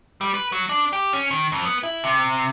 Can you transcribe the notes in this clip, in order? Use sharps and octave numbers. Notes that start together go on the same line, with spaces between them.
G3
B4
F#3
D4
G4
C#4
D#3
F2
B3
E4
C3